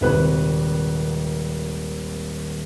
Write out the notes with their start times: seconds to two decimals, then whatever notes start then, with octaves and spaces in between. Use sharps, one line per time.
0.01 D#1 G#1 C3 B4 C5 F#6